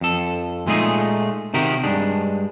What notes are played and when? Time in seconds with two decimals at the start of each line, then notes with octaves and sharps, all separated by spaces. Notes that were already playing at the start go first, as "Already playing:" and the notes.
0.01 F2 A4
0.67 A#2 G#3 A3 D#4 F4 G#4
1.54 C3 D#3 F#4 G4 A#4
1.84 G2 G#3 D4